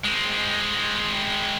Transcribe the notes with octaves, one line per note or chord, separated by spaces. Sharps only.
G#3 C4